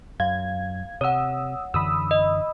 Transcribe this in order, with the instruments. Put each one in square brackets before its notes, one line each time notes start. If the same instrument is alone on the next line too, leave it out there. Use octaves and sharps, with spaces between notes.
[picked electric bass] F#2 [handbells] F5 [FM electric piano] G#6
[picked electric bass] C3 [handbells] C#5 F#5 [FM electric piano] D#6 E6
[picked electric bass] F#2 D3 E3 [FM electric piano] B5 D#6 E6
[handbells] D#5